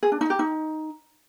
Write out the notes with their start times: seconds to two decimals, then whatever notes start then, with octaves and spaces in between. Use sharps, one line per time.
0.03 G#4
0.12 D4
0.21 D#4
0.30 G4
0.39 D#4